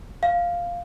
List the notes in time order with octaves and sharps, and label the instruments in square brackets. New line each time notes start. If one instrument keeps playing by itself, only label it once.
[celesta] F5